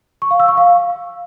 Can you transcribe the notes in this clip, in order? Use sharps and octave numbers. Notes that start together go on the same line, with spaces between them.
C#6
F5
E6
C#6
F5